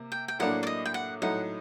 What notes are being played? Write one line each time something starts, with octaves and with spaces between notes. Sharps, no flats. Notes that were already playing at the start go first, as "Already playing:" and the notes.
Already playing: C3 A#3
G5
G5
A2 F#3 A#3 D4 F#5
D5
D#5
G5
F#5
A2 F#3 A3 D#4 F#5